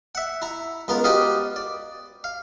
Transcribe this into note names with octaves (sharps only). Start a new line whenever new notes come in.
E5 F#5
E4 A#5
C#2 B3 F4 A#4 A#5
F#4 G4 C5 D5 D#5 F5
D5
F5